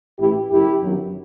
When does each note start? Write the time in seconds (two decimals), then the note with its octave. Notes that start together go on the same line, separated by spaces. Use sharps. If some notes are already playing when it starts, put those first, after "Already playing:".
0.19 A1 A2 E3 E4 G4
0.50 F#1 F#2 F#3 E4 G4
0.82 G1 F#2 D#3 F#3